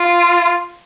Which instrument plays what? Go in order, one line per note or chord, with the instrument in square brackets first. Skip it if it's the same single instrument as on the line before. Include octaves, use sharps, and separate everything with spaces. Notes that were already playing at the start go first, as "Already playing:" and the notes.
Already playing: [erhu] F4